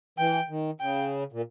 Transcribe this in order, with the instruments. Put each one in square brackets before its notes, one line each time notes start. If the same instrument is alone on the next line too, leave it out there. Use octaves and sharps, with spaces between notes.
[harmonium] E3 [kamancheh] G5
[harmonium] D#3
[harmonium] C#3 [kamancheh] G5
[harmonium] A#2